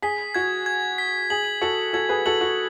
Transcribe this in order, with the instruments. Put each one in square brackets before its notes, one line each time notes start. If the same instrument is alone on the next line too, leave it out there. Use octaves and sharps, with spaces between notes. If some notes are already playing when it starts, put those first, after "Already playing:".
[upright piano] G#4 [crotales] B6
[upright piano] F#4 [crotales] G#6
[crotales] G#6
B6
[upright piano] G#4 [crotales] F#7
[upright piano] F#4 A4 [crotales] F#7
[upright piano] F#4 A4 [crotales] G#6
[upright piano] G#4 B4
[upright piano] F#4 A4 [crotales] F#7
[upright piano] F#4